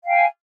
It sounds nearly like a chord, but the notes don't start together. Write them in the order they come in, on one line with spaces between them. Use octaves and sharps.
F5 G5 G#5